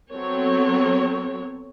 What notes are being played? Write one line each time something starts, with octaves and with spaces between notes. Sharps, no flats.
F#3 B3 C4 A4 C#5